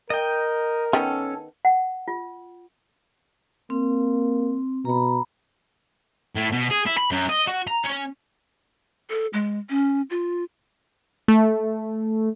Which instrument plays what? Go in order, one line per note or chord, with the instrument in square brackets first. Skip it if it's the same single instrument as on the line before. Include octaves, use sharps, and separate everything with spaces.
[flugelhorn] A#4 [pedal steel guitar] D#5 G5
[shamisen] D#3 B3 G5 [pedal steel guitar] C#4 A4
[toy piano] F#5
F4
[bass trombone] A#3 [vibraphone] C4
[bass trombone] B2 [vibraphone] A#5 B5
[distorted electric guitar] A2
B2
G#4
E4
B5
F#2
D#5
F#4
A#5
C#4
[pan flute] A4
G#3
C#4
F4
[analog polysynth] A3